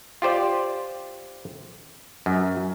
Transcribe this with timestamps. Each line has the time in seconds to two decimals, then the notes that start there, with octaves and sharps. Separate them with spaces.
0.22 F4 G4 C5 D5
2.26 F#2